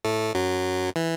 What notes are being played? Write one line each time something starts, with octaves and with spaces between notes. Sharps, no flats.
A2 A3
F#2 F#3
E3